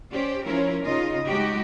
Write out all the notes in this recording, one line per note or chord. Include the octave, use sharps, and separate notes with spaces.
C#4 G4 C5 D5
F3 C#4 E4 F4 A#4 C#5
C#3 D#4 F4 D#5
G#3 D#4 F#4 G4